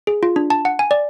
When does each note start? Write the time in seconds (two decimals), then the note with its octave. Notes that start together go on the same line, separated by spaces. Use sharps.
0.07 G#4
0.23 F4
0.36 D4
0.50 A5
0.65 F#5
0.79 G#5
0.91 D5